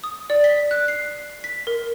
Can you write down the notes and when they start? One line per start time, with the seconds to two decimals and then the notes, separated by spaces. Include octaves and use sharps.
0.04 D#6
0.30 D5
0.44 B6
0.71 F#6
0.88 C7
1.44 B6
1.67 A#4